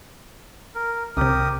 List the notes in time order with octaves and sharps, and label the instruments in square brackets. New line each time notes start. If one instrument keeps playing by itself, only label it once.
[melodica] A#4
[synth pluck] C2 C3 [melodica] G4 A#4 D#6